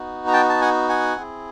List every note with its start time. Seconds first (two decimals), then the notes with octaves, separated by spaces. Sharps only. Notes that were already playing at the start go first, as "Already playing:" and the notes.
Already playing: B3 D#4 F#4
0.27 A#5
0.33 G5 A5
0.49 A5
0.61 F#5 G#5
0.89 F#5 G#5
1.17 C4 E4 G#4